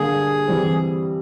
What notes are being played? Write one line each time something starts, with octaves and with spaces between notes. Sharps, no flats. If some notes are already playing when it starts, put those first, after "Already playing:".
Already playing: D3 G3 A#3 G#4
E3 G3 C4